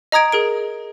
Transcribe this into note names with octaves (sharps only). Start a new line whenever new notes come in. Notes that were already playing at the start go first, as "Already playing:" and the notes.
D#5 A#5 D#6 G#6 D7
G#4 A#4 D7